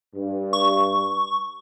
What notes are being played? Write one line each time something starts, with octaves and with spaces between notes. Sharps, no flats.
G2
C#6